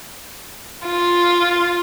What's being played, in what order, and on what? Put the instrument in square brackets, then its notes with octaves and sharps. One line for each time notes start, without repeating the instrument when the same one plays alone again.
[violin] F4